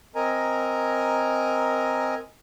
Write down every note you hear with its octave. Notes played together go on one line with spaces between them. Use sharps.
C4 A#4 D#5 G#5 A#5